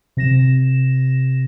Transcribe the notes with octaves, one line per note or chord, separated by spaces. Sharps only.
C3 A#6 E7